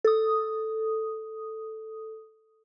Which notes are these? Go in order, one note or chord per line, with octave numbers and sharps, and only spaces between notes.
A4 D#6